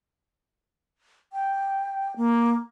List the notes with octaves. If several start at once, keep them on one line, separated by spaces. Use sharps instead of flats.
G5
A#3